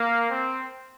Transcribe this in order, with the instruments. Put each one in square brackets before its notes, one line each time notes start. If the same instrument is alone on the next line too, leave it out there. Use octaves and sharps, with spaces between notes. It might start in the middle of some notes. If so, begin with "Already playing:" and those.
Already playing: [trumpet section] A#3
C4